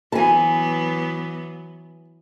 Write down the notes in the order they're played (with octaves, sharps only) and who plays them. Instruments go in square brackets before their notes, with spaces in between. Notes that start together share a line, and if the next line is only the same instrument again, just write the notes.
[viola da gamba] E3 F#3 B3 [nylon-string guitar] G#5 A5